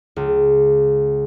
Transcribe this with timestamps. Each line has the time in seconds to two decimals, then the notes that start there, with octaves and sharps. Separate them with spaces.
0.16 C#2